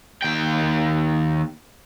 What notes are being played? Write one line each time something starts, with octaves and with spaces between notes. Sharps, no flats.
D#2 G5